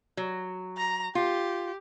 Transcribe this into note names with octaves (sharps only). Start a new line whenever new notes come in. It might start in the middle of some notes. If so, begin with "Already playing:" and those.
F#3
A#5
F4 G4